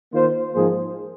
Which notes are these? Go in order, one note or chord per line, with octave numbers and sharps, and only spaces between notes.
D#3 A#3 F4 C5
G#2 F3 A#3 G#4 C5